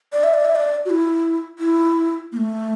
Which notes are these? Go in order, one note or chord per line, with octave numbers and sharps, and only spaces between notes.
D5
E5
D5
E5
D5
F#4
E4
E4
A#3
A3